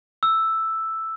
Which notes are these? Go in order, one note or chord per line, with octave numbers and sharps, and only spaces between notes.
E6